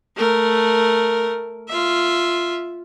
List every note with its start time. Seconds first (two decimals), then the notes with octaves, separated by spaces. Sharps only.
0.16 A3 A#4
1.69 F4 E5